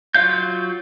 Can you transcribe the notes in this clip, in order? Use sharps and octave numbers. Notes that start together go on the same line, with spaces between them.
F#3 F4 C#5 F5 G6